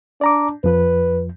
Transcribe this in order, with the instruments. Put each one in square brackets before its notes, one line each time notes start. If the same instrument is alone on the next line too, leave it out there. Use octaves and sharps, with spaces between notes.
[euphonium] D4 [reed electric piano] D5 A#5 D6
[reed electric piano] F2 F3 [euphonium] B4